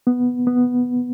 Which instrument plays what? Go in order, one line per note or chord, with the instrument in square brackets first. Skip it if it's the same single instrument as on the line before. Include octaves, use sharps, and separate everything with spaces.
[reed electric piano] B3
B3